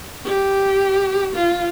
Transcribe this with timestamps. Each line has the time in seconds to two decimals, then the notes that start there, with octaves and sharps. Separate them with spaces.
0.24 G4
1.35 F4